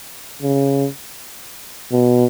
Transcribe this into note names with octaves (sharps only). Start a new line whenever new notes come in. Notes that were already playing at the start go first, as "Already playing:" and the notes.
C#3
B2